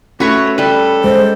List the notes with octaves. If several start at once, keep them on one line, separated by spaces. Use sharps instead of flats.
A3 C#4 F#4 B4 C#5 C#6
G3 A4 B4
G#3 C5